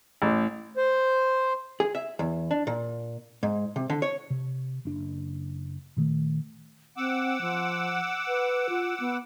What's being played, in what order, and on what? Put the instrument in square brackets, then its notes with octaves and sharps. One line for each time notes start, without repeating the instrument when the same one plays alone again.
[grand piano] A1
[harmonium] C5
[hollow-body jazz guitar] G#4
E5
E2
D4
A#2
G#2
C3
D3
C#5
[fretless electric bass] C3
F#1 D4
A#2 D#3 A3
[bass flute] C4 [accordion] F#5 D6 E6
[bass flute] F3
B4
F4
B3